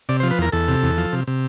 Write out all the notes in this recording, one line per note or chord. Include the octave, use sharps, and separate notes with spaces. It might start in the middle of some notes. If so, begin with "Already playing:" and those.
C3 D5
F3 C5
B4
E2 A#4
E2 A4
C3
E2
F3
C3
C3